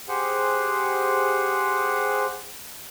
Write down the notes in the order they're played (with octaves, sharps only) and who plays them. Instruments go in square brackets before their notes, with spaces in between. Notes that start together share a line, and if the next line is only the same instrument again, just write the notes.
[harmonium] G4 G#4 C5 F#5